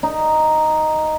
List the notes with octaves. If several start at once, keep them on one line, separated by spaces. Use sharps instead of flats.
D#4